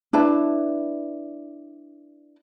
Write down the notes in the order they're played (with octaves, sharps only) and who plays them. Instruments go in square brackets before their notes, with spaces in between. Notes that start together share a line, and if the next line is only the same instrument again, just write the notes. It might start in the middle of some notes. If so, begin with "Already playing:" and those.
[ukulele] D4 E4 B4 A5